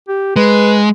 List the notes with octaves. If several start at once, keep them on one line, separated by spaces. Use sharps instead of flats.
G4
G#3 B4